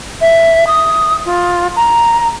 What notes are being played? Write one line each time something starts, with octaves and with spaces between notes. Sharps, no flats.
E5
D#6
F4
A#5